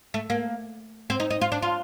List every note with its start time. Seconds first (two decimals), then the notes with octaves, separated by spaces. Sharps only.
0.14 A3
0.30 A#3
1.10 C4
1.20 D#4
1.30 D#4
1.41 F4
1.52 D4
1.62 F4